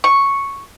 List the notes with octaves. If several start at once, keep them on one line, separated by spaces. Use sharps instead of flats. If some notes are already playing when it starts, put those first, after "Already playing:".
C#6